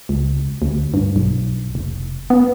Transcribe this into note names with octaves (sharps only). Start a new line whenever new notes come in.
C#2
D2
G2
B1
F1
B3